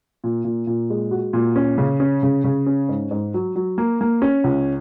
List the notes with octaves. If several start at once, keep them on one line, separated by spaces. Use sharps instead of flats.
A#2
A#2
A#2
G#3
F#4
A#2
C#4
C#3
C#4
C#3
C#3
C#4
G#2
G#2
F#3
F#3
A#3
A#3
C#4
C#2